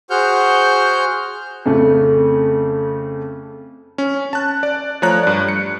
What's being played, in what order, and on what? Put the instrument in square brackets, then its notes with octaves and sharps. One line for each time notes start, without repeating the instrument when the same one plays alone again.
[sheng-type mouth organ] F#4 G#4 C5 F#5 F6 G6
[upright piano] F2 C#3 A3
[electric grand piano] C#4
A5 F#6
D5
F3 A3 C#5 A#5 F#6
G2 D5
C#7